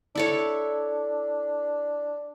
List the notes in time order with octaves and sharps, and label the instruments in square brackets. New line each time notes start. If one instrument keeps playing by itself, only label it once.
[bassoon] D4 [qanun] E4 A4 C#5